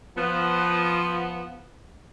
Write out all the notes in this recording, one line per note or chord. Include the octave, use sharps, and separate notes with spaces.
F3 B3